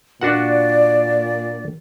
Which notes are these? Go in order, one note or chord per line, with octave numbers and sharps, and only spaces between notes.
A#2 D4 F#4 D5 F#5